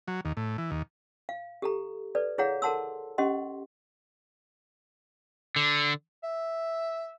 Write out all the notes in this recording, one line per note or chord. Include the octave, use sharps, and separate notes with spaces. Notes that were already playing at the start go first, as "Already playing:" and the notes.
F#3
D#2
A2
E3
D#2
F5
G4 A4 A#5
A4 B4 D5
E4 G#4 C#5 F5 F#5 A#5
A4 A#4 F#5 A5 C6 E6
C#4 G4 D#5 F#5 C6
D3
E5